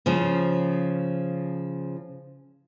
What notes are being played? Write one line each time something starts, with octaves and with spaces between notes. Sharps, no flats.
C#3 F3 C#4